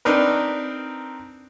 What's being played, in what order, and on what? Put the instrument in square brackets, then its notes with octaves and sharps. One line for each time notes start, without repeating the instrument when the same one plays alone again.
[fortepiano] C4 D4 D#4 A#4 B4